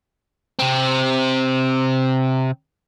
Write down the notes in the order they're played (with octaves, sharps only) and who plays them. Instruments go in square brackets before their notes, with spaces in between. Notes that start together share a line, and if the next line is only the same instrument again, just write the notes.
[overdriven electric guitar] C3 C4